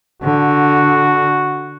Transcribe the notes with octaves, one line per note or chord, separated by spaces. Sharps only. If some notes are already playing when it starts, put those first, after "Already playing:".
D3 F#4